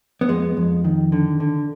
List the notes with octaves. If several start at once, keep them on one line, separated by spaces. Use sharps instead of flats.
B3
F2 G#3
F2
D#3
D3
D3